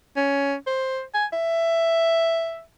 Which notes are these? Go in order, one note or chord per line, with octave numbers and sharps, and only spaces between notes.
C#4
C5
G#5
E5